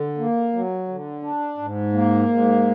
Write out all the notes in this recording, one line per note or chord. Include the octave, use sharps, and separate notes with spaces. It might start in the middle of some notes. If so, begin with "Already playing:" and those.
Already playing: D3
A#3
F#3
D3
D4
G#2
A#3
G#2